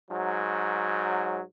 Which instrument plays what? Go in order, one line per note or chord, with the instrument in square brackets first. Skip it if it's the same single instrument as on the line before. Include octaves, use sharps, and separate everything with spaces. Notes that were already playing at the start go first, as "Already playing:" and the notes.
[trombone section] G#2 F#3